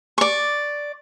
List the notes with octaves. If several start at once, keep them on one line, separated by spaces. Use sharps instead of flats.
D5 C#6